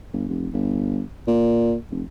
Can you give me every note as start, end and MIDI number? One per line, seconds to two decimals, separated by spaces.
0.13 0.24 31
0.28 0.48 29
0.53 1.01 31
1.27 1.75 46
1.91 2.03 29